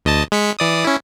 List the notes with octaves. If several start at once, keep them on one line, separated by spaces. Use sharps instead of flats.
D2 D#5 A5
G#3 B6 C#7
E3 D5 D#6
C#4 E4